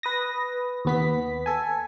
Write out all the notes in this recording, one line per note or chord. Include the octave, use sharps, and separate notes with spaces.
B4 D#6 A#6
D#2 B3 B6
A4 G#5